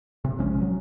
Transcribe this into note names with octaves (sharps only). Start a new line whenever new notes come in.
C3
A#1 F3 G#3 C#4
F#3